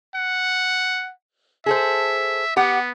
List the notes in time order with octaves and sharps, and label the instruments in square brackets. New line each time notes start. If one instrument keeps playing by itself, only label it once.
[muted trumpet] F#5
[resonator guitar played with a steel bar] G#4 A4 C5 [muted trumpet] E5
[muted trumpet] B3 [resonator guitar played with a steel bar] G4 F#5